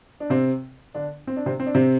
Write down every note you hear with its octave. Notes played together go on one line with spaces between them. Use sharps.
D4
C3 C4
D3 D4
C4
D4
C3 C4
C4
D4
C3 C4